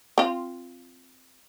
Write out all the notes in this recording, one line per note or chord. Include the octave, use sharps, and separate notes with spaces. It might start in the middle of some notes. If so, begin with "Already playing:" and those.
C4 F4